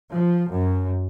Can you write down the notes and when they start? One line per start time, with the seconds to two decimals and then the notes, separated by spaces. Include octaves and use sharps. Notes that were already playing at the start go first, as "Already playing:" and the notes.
0.13 F3
0.52 F#2